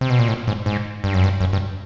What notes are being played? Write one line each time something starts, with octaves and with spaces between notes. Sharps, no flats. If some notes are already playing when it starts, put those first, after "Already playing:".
C3
B2
A#2
A2
G#2
G#2
G2
F#2
G2
F#2
G2